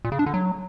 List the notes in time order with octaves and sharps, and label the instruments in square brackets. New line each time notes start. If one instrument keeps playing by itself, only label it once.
[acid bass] A#2
C#3
D4
D3
F#3